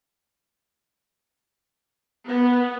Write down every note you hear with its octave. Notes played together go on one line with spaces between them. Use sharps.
B3